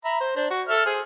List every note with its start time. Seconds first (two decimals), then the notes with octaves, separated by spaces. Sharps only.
0.05 E5 A#5 B5
0.21 C5
0.36 D4 C5
0.50 F#4
0.68 A4 E5 F6
0.86 G#4 C5